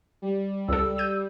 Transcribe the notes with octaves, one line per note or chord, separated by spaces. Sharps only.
G3
C#2 A4 E6
G6 D#7